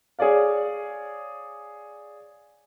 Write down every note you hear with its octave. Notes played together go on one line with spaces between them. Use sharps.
G#4 C#5 D5 F5